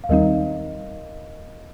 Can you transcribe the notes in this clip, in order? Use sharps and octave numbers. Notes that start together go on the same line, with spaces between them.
F5
D#2 D#3 G3 C4 D#4 A#4 D#5